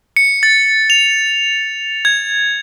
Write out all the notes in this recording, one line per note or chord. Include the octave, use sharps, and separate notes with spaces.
C#7
A6
F7
G#6